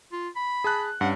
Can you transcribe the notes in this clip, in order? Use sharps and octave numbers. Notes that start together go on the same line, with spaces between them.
F4
B5
G#4 A5 F#6
G2 C#4 F#5